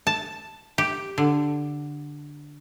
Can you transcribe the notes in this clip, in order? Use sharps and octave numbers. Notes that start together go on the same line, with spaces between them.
A5
G4
D3